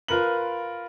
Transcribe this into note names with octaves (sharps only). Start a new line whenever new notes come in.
F4 A#4 B4 F#7